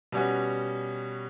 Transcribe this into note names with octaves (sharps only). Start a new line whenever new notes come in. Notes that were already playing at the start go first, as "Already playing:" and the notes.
B2 G3 C#4 F#4